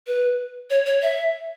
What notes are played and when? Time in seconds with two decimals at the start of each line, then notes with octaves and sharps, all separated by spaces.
0.07 B4
0.70 C#5
0.86 C#5
1.02 E5